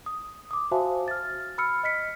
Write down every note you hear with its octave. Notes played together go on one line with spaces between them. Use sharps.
D#6
D6 D#6
F#4 C5 E5 F5 G#5 A5
F6 A6
B5 E6 F6 C#7
D#5 F6 B6 C#7